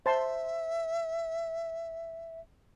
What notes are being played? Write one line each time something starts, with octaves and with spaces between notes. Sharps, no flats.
C5 E5 A5 C6